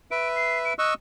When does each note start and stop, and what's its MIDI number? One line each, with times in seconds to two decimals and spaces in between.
0.11 0.73 71
0.11 0.73 76
0.11 0.28 98
0.36 0.59 96
0.65 0.74 98
0.79 0.94 75
0.79 0.94 85
0.79 0.94 88
0.79 0.92 90